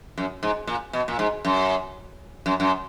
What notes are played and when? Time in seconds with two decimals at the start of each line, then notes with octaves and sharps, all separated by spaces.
0.18 F#2
0.43 G#2
0.67 A#2
0.93 B2
1.08 A#2
1.19 G#2
1.45 F#2
2.46 F#2
2.60 F#2